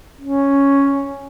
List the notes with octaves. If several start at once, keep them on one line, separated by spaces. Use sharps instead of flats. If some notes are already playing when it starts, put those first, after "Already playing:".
C#4